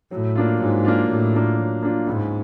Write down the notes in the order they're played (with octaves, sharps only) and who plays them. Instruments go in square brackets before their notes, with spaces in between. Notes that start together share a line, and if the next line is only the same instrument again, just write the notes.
[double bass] A2 [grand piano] F#3
[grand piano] A#3 D4 F4
[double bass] G#2 [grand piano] F#3
[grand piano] A#3 D4 F4
[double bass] A2 [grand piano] F#3
[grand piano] A#3 D4 F4
F#3
A#3 D4 F4
[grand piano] C#2 [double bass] G#2